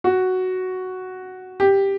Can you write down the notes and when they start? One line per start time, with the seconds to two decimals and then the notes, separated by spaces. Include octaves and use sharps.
0.04 F#4
1.60 G4